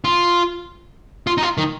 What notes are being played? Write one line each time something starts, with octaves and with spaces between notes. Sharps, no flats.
F4
F4
D#4
F4
D#3